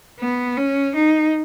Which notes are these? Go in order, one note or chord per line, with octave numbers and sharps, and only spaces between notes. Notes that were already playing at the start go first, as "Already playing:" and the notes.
B3
C#4
D#4